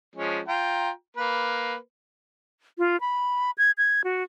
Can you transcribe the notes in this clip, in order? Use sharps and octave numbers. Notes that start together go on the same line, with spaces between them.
F3 G#3 C#4
F4 G5 A#5
A#3 B4
F4
B5
G#6
G#6
F#4